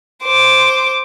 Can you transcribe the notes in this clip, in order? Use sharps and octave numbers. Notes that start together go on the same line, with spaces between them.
C5 D6